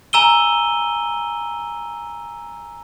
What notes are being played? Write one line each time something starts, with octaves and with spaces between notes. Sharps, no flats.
G#5 A#5 E6 D#7 G7